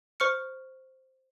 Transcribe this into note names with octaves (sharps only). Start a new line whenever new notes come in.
C5 C#6 F6 C#7